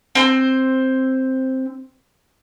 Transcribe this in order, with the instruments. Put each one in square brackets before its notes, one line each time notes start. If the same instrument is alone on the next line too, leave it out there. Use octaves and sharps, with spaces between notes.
[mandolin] C4 C5